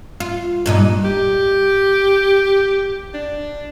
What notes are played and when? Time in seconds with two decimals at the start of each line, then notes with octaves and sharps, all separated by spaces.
0.20 F4
0.66 G2 A#2 D#4
1.05 G4
3.14 D4